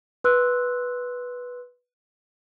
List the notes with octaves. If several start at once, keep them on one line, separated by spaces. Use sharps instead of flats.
B4 C6 E6 F#6